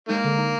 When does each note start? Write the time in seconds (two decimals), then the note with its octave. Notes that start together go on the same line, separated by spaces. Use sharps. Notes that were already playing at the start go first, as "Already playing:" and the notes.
0.09 D#3 G#3 A#3
0.24 D3
0.38 D#4